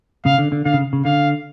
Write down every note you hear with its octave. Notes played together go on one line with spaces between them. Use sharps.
C#3 F5
D3
D3
D3 F5
C#3
C#3
D3 F5